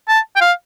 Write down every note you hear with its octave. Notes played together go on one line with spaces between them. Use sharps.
A5
G5
F5